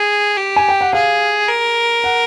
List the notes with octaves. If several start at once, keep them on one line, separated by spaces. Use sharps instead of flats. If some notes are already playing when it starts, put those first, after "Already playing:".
Already playing: G#4
G4
G#5
G5
F#5
G#4 F5
A#4
F#5